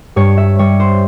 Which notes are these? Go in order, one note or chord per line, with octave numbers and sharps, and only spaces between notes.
G2 C#5
E5
G3 C#5
C5